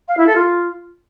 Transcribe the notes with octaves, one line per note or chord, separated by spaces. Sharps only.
F5
E4
A4
F4